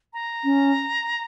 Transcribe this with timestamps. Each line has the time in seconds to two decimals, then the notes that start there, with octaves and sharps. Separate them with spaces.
0.13 A#5
0.44 C#4